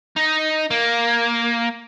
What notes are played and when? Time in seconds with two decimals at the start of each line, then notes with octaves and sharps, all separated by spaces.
0.17 D#4
0.71 A#3